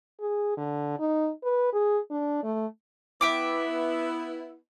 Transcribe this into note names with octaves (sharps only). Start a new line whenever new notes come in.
G#4
D3
D#4
B4
G#4
D4
A3
B3 E4 E5 G5 D6